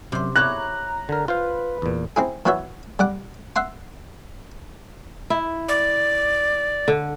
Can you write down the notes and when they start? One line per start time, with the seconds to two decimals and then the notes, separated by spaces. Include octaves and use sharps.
0.12 F#2 C3 C5
0.36 E4 G4 C#5 A#5 F#6
1.09 D3 A#4
1.28 F4 B4 C5 F5
1.82 E2 A#2
2.16 C4 E4 G#4
2.46 E3 B3 F#4 C#5 E5
2.99 G3 F#5 D6
3.56 E5 F#5 C6
5.30 E4
5.68 D5
6.88 D3